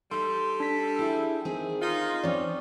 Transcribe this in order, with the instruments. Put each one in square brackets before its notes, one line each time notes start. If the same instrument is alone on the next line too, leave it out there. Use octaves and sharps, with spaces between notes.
[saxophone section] G3 A4 [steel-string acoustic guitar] D#4 [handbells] C6
[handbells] D4 B6
[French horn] E4 [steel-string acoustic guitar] G4 G#4
[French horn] D#3 [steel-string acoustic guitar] C4 G#4
[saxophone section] D#4 F4 [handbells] F5
[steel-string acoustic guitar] F3 C#4 [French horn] C4 [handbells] D5